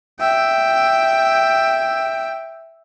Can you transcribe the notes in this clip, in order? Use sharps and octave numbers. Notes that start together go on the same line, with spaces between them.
E5 G5